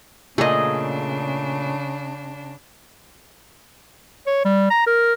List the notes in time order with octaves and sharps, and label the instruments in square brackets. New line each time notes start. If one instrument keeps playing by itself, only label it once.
[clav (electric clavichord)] A#2 A3 [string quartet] C#3 D4 [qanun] G#4 D#5
[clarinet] C#5
G3
A#5
A#4